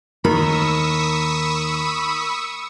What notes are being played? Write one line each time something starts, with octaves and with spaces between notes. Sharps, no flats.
D#2 A#4 B5 C#6 D#6 E6